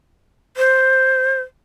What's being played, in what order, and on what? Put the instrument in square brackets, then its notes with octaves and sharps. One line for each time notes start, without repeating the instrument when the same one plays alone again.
[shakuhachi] C5